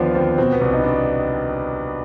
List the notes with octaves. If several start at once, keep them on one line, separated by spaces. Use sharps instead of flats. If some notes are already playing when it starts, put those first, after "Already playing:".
Already playing: D#2 D3 F3 B3 D4 F4
D#2 C4
B2 C4
B3
C2 C4
D#4
D4